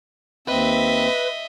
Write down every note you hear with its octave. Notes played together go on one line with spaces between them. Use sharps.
D#2 C4 B4 D#5 E5